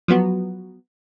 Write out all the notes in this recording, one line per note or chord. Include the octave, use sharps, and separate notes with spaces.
F3 F#3 B3 F#4